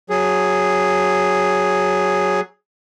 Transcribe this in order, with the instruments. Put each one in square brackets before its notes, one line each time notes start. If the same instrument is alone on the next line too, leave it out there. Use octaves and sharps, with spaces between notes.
[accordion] F#3 G#4